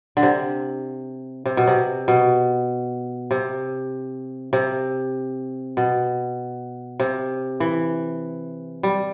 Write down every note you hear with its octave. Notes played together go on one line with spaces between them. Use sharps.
D3
C3
C3
B2
C3
B2
C3
C3
B2
C3
E3
G3